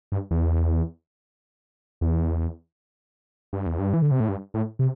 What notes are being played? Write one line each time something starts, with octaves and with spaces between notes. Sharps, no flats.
G2
E2
E2
G2
E2
G2
E3
D3
C3
A2
G2
A2
C3